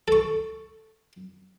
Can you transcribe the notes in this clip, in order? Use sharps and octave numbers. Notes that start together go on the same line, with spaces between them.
A4 C#6